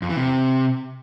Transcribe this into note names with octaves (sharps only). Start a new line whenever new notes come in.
F2
E3
C3